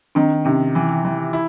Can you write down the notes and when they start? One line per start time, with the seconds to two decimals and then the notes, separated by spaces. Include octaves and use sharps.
0.15 D#3 C4 D4
0.45 C3 C#4 D#4
0.75 E3
1.05 E3
1.33 E4